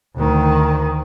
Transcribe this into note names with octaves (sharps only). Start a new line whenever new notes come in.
D2 D#3